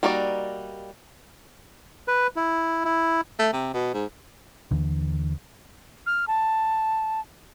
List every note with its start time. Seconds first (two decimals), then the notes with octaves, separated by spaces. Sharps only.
0.03 G3 A#3 D#4 F#4 D5
2.08 B4
2.36 E4
2.85 E4
3.39 A3
3.53 C3
3.74 B2
3.94 G#2
4.71 D#2 D3 E3
6.06 F6
6.28 A5